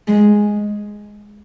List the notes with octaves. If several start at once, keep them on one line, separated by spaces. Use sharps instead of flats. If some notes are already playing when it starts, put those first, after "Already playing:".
G#3